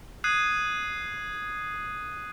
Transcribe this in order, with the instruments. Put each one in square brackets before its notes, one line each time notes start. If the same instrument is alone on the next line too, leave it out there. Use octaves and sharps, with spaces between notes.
[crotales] D#6 F#6 G#6 C7 D#7